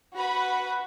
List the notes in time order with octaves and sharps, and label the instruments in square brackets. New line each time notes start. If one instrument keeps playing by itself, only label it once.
[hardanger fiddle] F#4 [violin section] B4 F#5 B5